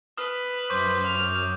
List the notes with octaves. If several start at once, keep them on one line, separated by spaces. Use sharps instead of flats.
B4 D#6 F6
F#2 C5 C#6 D6 G6
F6